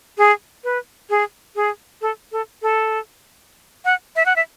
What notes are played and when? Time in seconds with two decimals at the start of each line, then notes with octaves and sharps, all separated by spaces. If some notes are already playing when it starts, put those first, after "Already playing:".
0.18 G#4
0.64 B4
1.10 G#4
1.56 G#4
2.02 A4
2.32 A4
2.62 A4
3.85 F#5
4.16 E5
4.26 F#5
4.36 E5